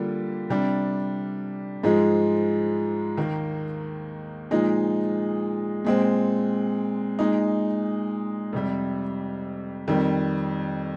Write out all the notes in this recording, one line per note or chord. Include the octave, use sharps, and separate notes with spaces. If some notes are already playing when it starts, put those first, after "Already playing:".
Already playing: D3 G3 A#3 F4
C3 G3 D4
G#2 F3 G#3
D#2 D#3 A#3
A#2 F3 G#3 D#4
A#2 G#3 C4
A#2 G#3 D#4
F2 C3 G3
F2 D#3 G3